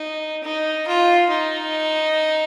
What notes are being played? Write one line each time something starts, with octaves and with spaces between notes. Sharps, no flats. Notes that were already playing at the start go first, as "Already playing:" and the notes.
Already playing: D#4
D#4
F4
D#4